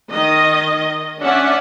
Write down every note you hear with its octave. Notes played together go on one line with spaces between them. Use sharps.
D#3 D#5
C#4 D4 D5 E5 F#5